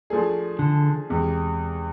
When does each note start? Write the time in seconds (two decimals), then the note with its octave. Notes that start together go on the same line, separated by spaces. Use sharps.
0.10 F3 A3 D4 G#4
0.59 D3
1.09 E2 C3 G#3